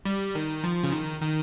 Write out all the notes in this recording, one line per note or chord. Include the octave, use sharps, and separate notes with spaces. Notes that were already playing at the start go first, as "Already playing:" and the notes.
G3
D#3
F3
C#3
D#3
D#3